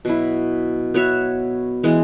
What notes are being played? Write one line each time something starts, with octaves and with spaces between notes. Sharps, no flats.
B2 F#3 E4
B3 F#4 C#5 E5
E3 G#3 B3